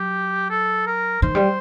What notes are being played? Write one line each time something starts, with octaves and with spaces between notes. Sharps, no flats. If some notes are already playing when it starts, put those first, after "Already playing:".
Already playing: F#3 G4
A4
A#4
D#3 C5
G3